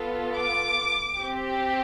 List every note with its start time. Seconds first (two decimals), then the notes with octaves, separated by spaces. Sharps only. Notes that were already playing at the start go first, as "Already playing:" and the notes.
Already playing: B3 F4 A4
0.36 D6
1.18 C4 G4